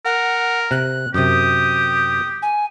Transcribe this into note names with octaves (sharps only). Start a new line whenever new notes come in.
A#4 F#5
C3 F#6
F#2 C3 G4 D#6
G#5